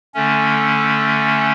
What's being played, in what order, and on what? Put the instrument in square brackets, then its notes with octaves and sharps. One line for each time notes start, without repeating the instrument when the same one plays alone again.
[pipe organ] D3 A3 C#4